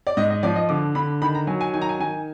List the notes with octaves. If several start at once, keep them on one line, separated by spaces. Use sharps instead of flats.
D5
G#2 D#5
D#5
F3 D5
D#5
D3 D6
D3 B5
D#3 B5
A#5
F#3 G#5
G#5
D#3 G#5
A#5
G#5
D#3 G#5